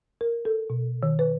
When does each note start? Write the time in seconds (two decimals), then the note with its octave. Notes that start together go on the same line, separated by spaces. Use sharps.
0.21 A#4
0.45 A4
0.70 B2
1.03 D#3
1.19 B4